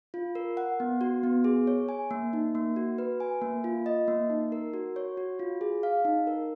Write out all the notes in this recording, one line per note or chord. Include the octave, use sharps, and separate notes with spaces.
F4
A#4
F#5
B3
F#4
B3
G#4
C#5
G#5
A#3
D#4
A#3
F#4
B4
G#5
A#3
F4
D#5
A#3
D#4
A#4
F#4
C#5
F#4
F4
G#4
F5
D#4
A#4